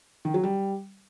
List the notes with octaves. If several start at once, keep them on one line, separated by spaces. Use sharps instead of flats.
D#3
F#3
G3